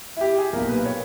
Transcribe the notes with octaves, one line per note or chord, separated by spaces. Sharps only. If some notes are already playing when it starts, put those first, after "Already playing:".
E4
G4
G#4
B1 A#2 A#3 A#4
B4
C#5